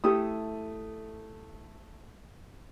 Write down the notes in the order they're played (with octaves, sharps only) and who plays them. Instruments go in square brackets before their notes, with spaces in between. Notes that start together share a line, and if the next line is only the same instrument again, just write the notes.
[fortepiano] A3 D#6 [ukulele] E4 G4 A4